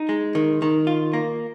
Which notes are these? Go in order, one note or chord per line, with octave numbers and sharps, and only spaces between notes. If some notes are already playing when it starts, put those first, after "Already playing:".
Already playing: D#4
G#3
D#3
D#3
F4
A#3